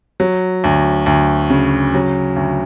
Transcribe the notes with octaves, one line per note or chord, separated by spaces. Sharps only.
F#3
D2
D2
C#3
F#3
D2